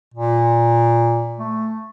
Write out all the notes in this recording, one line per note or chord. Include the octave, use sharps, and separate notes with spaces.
A#2
A3